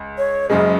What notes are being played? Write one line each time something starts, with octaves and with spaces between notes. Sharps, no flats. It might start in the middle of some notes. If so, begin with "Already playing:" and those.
Already playing: C#2
C#5
F#1 F#2 C#3 G#3 D#5